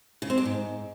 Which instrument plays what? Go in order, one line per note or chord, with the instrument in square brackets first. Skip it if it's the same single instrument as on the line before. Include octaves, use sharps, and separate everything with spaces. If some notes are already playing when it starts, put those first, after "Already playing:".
[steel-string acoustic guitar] C#3
C4
D4
G#2